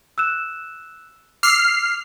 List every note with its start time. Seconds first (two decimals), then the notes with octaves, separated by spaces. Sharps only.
0.18 E6 F#6 E7
1.43 D6 E6 F6 C7